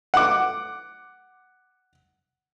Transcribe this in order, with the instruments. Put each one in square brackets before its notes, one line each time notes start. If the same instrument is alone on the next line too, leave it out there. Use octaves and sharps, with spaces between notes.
[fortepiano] F#5 D6